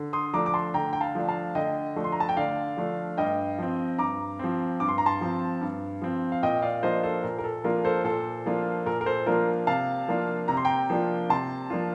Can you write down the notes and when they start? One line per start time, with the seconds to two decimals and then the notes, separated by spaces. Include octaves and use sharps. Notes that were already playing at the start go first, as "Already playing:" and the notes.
Already playing: D3
0.13 C6 D#6
0.34 F3 A3 D4 A#5 D6
0.46 D6
0.54 A5 C6
0.74 D3 G5 A#5
0.93 G5
1.01 F5 A5
1.15 F3 A3 D4
1.28 F5 A5
1.55 D3 D#5 G5
1.96 F3 A3 D4
2.04 C6
2.12 A#5
2.20 A5
2.29 G5
2.37 D3 D5 F5
2.77 F3 A3 D4
3.18 G2 D#5 G5
3.58 F3 C4
3.98 G2 A#5 D6
4.39 F3 C4
4.80 G2 D6
4.88 C6
4.98 A#5
5.06 A5 C6
5.21 F3 C4
5.61 G2
6.02 F3 C4
6.32 F5
6.43 A#2 D#5 G5
6.62 D5 F5
6.83 F3 A#3 D4 F4 C5 D#5
7.03 A4 C5
7.24 A#2 A#4
7.39 A#4
7.44 A4
7.64 F3 A#3 D4 F4 A#4
7.85 A4 C5
8.04 A#2 A4 C5
8.46 F3 A#3 D4 F4
8.86 A#2 A#4
9.01 A#4
9.06 A4 C5
9.26 F3 A#3 D4 F4 A#4
9.67 C3 F5 A5
10.08 F3 A#3 D4 F4
10.48 C3 A#5
10.57 C6
10.65 G5 A#5
10.90 F3 A#3 D4 F4
11.30 C3 A5 C6
11.70 F3 A#3 D4 F4